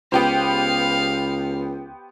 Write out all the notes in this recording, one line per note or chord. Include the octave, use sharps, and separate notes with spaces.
C#2 B3 G4 C5 F5